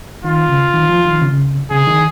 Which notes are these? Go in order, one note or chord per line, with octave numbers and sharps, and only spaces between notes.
D#3 F4
C#3
D#3
F3
D#3
C#3
C#3 G#4
D#3